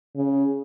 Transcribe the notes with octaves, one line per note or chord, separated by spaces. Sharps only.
C#3